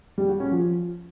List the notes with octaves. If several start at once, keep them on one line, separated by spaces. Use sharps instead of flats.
G3
F#4
C#4
F3